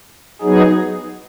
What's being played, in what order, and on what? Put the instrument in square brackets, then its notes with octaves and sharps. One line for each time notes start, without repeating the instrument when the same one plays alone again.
[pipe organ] F#3 B3 D#4 G#4